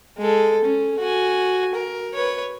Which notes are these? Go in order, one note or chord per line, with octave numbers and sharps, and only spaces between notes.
G#3 A4
C#4
F#4 G#5
A#4
B4 C#5